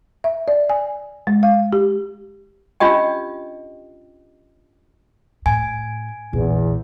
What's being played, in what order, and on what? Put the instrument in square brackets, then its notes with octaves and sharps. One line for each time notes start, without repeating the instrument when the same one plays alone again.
[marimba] E5
D5
G#5
G#3
F5
G4
[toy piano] C#4 D4 F4 G4 D#5 G5
[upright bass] A2 [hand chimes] G#5
[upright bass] A#1 [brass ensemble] E2